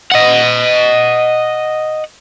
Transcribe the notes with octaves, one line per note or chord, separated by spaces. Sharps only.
D#5 F#5